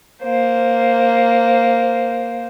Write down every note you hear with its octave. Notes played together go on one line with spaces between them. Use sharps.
A#3 C5